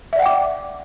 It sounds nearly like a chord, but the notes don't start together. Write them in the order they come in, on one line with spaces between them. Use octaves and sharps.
E5 D5 F#5 G5 D6